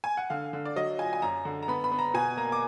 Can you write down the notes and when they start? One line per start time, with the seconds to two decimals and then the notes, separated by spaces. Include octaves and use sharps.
0.04 G#5
0.17 F#5
0.30 D3 F5
0.53 D3
0.65 D5
0.76 F#3 D#5
0.99 F4 G#5
1.13 G#5
1.22 F#2 A#5
1.45 D3
1.63 A#5
1.68 B3 B5
1.84 B5
1.92 B3
1.99 A#5
2.14 B2 G#5
2.37 A#3 A#5
2.52 D6